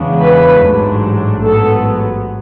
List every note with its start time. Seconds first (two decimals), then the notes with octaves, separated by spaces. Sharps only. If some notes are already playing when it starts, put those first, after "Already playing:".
Already playing: E2 C#3 G#3 B3 D4
0.22 B4
0.63 A1 G#2 F#3 A3 D4
1.44 A1 G#2 F#3 B3 A4